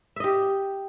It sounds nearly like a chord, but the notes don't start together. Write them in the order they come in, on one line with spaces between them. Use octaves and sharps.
E5 D#5 G4